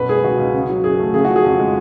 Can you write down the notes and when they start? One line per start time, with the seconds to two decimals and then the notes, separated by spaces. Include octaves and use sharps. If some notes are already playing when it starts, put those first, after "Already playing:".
Already playing: F#2 B2 B4
0.09 G#3 G#4
0.24 C#2 F#4
0.38 C#2
0.54 C#3
0.70 F#3
0.84 F#2 G#4
0.99 A3
1.14 C#3 G#4
1.25 F3 F#4
1.36 G#4
1.45 F2
1.59 G#3